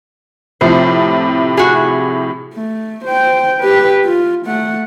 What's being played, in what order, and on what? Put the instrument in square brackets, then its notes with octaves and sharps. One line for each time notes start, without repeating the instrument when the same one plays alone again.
[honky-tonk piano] A2 C3 F3 [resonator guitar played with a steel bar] C5
[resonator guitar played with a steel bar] F#4 G#4
[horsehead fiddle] A3
C5 G5
G4 B4
F4
A3 F#5